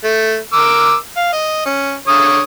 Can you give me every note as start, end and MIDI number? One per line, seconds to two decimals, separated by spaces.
0.04 0.38 57
0.53 0.94 70
0.53 0.94 86
0.53 0.94 88
1.16 1.31 77
1.32 1.63 75
1.66 1.95 61
2.08 2.40 50
2.08 2.40 73
2.08 2.40 87